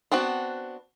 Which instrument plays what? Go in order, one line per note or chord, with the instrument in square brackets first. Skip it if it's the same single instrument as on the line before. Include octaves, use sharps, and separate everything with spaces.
[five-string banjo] B3 C4 D4 F#4